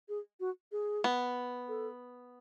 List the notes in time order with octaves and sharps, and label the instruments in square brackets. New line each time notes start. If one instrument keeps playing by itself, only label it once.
[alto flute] G#4
F#4
G#4
[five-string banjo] B3
[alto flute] A4